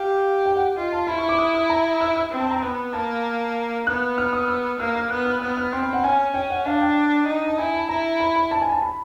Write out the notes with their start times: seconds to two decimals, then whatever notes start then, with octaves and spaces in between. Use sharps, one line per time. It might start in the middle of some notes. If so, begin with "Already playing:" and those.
Already playing: G4 F5
0.46 G5
0.56 F#5
0.77 F4 D#5
0.93 A5
1.07 E4 B5
1.18 C#6
1.29 D6
1.39 D#6
1.54 D#6
1.70 A#5
2.01 E6
2.16 E6
2.31 C4
2.40 A5
2.51 A#5
2.63 B3 B5
2.93 A#3 A5
3.87 B3 F#6
4.18 F6
4.33 D#6
4.48 E6
4.79 A#3 F6
4.95 F6
5.10 B3 F#6
5.26 F6
5.41 B3 F6
5.57 F6
5.73 C4 C6
5.83 B5
5.93 F#5
6.04 C#4 G#5
6.34 C#4 G5
6.50 F#5
6.66 D4 F5
6.81 G5
7.28 D#4
7.47 A5
7.58 E4 G#5
7.74 A5
7.89 E4 A#5
8.20 B5
8.36 B5
8.51 A5
8.62 G#5
8.72 A5
8.82 B5